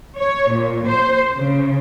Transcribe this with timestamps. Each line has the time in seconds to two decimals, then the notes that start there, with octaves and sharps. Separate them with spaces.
0.19 C#5
0.52 A#2
0.89 C5
1.36 C#3